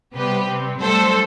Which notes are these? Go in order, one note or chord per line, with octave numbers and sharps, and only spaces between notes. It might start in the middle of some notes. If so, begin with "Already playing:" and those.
C3 G3 B3 G4 B4
C3 G3 C4
G2 F#3 A3 C4 A4 C5